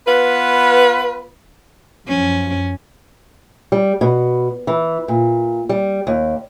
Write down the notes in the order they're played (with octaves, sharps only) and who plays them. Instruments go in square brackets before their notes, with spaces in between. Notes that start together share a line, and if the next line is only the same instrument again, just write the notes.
[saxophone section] B3 F4 B4
[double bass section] F#2 F3 [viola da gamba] C#4
[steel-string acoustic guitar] G3
B2
E3
A#2
G3
D#2